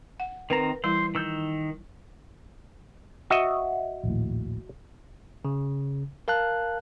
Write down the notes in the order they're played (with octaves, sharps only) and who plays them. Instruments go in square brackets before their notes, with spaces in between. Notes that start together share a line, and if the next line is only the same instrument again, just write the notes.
[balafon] F#5
[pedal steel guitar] D#3 C4 A#5 [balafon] A#4 B4
[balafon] E3 G3 E4 [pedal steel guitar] C5
[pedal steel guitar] D#3 E6 G6
[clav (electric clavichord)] F#4 D#5 E5
[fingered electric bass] A#1 D#2 A2
[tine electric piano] C#3
A#4 F5 A5 F#6